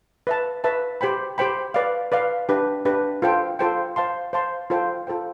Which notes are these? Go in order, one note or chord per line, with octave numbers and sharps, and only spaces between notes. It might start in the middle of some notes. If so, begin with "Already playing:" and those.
B4 E5 A5
B4 E5 A5
G4 C5 G5 B5
G4 C5 G5 B5
B4 D5 F5
B4 D5 F5
D4 G4 B4
D4 G4 B4
F4 A4 C5 G5
F4 A4 C5 G5
C5 F5 A5 C6
C5 F5 A5 C6
F4 A4 C5 G5
F4 A4 C5 G5